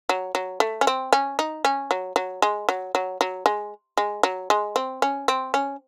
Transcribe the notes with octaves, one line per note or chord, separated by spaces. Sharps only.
F#3
F#3
A3
C#4
C4
C#4
D#4
C#4
F#3
F#3
G#3
F#3
F#3
F#3
G#3
G#3
F#3
G#3
C4
C#4
C4
C#4